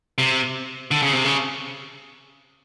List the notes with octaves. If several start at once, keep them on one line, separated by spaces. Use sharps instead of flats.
C3
D3
C#3
C3
C#3